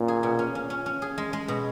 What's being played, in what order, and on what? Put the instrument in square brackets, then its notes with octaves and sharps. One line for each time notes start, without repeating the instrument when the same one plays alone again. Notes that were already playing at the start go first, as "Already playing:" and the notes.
Already playing: [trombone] A#2 [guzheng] C#4
[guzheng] G#4
B2
C#4
C#4
C#4
C#4
G#4
G#3
G#3
B2